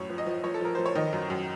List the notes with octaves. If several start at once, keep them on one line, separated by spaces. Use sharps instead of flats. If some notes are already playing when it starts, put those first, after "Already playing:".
Already playing: F#2 A2 C#5
F3
D#5
F3
F3 C#5
A4
F3 A#4
F3 C5
C#5
D#3 D#5
F#2
F#2